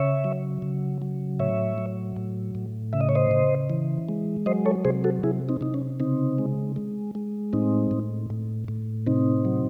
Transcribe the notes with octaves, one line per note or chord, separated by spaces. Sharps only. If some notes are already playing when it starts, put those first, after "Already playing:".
Already playing: C#3 C#5 E5
F#3
C#3
F#3
A2 C#5 E5
F#3
A2
A2
C#3 E5
D#5
C#5
C5 D#5
C#3
E3
G#3
F#3 C5 D#5
A4 C#5
C3 G#4 C5
F#4 A4
C3 E4 G#4
C4 D#4
C3 D#4
C#4
C#3 C4 D#4
G#3
G#3
G#3
A2 C4 D#4
A2
A2
A2
C3 C4 D#4
F#3